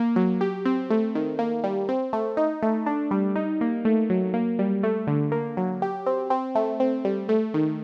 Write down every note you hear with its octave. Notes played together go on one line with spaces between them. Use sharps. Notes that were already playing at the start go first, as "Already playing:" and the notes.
Already playing: A#3
F#3
G4
C4
A3
D#3
A#3
G3
C4
A3
D#4
A3
D4
G3
D#4
A#3
A3
F#3
A#3
G3
A3
D3
A#3
F#3
G4
C4
C4
A3
C4
G3
A3
D#3